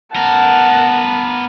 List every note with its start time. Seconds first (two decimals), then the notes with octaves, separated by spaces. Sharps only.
0.16 B3 A#4 F#5 A5